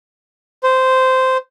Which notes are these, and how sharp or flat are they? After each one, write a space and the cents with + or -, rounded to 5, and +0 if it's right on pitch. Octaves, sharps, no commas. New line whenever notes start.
C5 -10